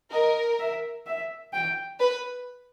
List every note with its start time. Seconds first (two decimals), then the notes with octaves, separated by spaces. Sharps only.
0.12 A#4 D#5
0.59 E5
1.06 E5
1.53 G5
2.00 B4